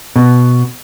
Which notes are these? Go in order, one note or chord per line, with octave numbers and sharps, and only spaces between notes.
B2